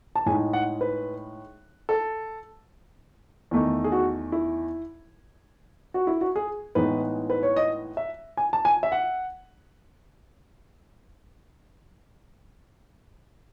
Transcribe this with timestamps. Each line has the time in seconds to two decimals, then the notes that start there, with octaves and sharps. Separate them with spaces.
0.16 A5
0.26 A2 G#3 D#4 G#5
0.53 F#5
0.81 B4
1.89 A4
3.51 E2 D#3 A3 D#4
3.84 G#4
3.92 F#4
4.32 E4
5.94 F#4
6.07 E4
6.21 F#4
6.36 G#4
6.75 A2 E3 G#3 B3 D#4 B4
7.30 B4
7.43 C#5
7.56 D#5
7.97 E5
8.37 G#5
8.53 A5
8.65 G#5
8.83 E5
8.92 F#5